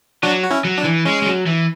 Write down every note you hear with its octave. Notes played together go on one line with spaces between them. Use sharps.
F#3 D4 F#4
F#4
C#4 E4
F#3
D4
E3
G#3 C#4
G#3
F#3
E3